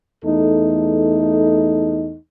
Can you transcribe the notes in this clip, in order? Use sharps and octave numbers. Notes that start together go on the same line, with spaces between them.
E2 A3 D#4 A4